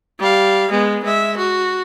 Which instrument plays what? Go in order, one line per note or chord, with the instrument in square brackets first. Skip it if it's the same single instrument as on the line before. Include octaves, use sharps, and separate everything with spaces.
[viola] G3 F5
G#3 B3
G#3 E5
F#4